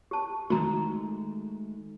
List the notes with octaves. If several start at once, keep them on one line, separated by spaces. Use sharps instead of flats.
G4 A5
D#3 G#3 A3 F#4 A#5